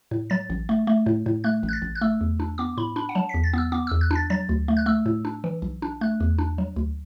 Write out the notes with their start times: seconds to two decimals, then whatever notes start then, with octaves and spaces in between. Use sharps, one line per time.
0.11 A2
0.30 F#3 A6
0.50 A1
0.69 A3
0.87 A3
1.06 A2
1.26 A2
1.44 A3 F#6
1.63 A1
1.69 F#6
1.73 A6
1.82 A1
1.95 F#6
2.01 A3 E6
2.21 E2
2.40 D4
2.58 B3 D6
2.77 A2 B5
2.96 D4 B5
3.09 F#5
3.15 F#3 A5
3.29 E2 B6
3.43 A6
3.53 B3 E6
3.72 B3 D6
3.87 E2 E6
4.01 F#6
4.11 D4 A6
4.30 F#3 A6
4.49 D2
4.68 A3
4.77 F#6
4.86 A3 E6
5.06 A2
5.25 D4
5.44 E3
5.62 B1
5.82 D4
6.01 A3 F#6
6.20 E2
6.38 D4
6.58 F#3
6.76 D2